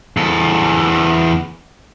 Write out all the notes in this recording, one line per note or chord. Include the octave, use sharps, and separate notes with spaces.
E2 A4